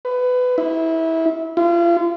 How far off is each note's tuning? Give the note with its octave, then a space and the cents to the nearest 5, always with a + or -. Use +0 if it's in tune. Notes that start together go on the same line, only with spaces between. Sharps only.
B4 +20
E4 -20
F4 -35